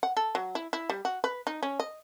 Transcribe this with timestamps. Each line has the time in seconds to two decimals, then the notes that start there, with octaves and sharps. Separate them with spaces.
0.03 F#5
0.17 A4
0.35 F#3
0.55 E4
0.73 E4
0.90 G3
1.05 F#4
1.24 B4
1.47 D#4
1.63 C#4
1.80 D#5